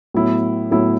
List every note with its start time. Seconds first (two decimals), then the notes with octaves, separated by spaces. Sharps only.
0.14 A2 F#3 B3 E4
0.71 A2 F#3 B3 E4